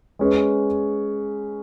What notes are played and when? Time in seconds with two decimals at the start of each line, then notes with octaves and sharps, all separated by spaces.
0.19 G#3 C#4 G#4 B4